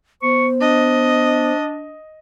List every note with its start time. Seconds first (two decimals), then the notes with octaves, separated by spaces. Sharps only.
0.22 B3 C5 C#6
0.61 D4 D#5